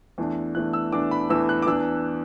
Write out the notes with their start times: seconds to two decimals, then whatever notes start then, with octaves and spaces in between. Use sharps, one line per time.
0.18 E2 E3 A3 D4
0.55 E2 E3 A3 D4 F#6
0.73 E6
0.93 E2 E3 A3 D4 D6
1.11 B5
1.29 E2 E3 A3 D4 E6
1.49 F#6
1.62 D6
1.66 E2 E3 D4 E6